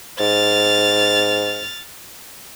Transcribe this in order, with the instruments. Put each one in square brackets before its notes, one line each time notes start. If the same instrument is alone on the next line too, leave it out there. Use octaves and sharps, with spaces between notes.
[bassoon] G#2 [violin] F6 A6